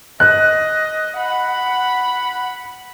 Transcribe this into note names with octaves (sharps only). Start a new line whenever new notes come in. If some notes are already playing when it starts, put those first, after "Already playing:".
D#5 F#6
F#5 B5